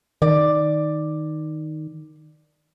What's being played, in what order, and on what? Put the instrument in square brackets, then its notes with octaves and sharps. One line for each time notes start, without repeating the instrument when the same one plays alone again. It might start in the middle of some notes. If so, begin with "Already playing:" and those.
[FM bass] D#3 [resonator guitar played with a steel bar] D5